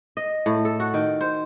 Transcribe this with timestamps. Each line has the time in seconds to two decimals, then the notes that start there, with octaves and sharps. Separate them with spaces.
0.17 D#5
0.46 A2
0.65 A4
0.80 F#4
0.94 D#3
1.21 C5